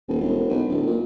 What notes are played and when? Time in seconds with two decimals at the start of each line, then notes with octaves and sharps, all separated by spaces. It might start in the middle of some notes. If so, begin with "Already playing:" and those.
0.08 D#1
0.21 E1
0.49 B1
0.69 D1
0.87 A#2